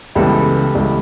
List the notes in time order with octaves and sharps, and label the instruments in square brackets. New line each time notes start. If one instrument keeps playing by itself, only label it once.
[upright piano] C#2 C#3 E3 G3 B3 [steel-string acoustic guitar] G4 A4
[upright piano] C#2 C#3 E3 G3 B3